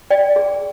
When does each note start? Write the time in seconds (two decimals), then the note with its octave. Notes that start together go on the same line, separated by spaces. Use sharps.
0.10 D5 G5
0.36 G#4